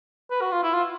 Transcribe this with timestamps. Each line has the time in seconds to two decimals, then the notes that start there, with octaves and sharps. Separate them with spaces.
0.31 B4
0.41 F#4
0.52 F4
0.63 E4
0.74 F4